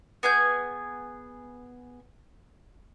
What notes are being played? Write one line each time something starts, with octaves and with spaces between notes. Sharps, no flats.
B3 G#4 G#5 G6